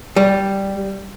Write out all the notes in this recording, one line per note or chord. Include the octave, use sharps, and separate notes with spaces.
G3